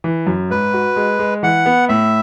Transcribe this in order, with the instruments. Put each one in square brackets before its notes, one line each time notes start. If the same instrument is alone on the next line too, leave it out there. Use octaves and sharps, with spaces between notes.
[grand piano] E3
F#2
[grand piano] G#2 [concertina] B4
[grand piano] F#4
G#3
G#3
[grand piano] E3 [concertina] F#5
[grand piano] B3
[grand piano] A2 [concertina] E5